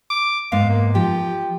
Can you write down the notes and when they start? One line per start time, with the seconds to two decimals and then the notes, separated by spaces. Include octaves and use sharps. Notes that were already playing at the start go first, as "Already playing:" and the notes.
0.10 D6
0.52 G#2 B3 F5
0.70 A#3
0.95 F3 G4